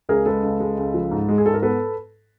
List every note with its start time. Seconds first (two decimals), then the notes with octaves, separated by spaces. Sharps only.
0.09 C#2 G#4 A#4
0.26 G#3 A4 B4
0.43 C#2
0.60 G#3
0.78 C#2
0.94 F3
1.11 G#2
1.29 G#3
1.38 G#4
1.46 G#2 A4
1.54 A#4
1.62 B3 A4 B4